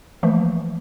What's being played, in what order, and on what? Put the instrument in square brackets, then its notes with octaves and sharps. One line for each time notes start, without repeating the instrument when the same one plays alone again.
[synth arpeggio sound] E3 F3 A3 A#3